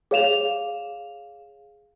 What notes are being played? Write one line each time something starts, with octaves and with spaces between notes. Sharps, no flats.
G#4 C#5 F5 E7 F7